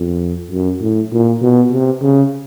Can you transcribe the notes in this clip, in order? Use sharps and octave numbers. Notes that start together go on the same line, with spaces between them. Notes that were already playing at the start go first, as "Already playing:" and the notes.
Already playing: F2
F#2
A2
A#2
B2
C3
C#3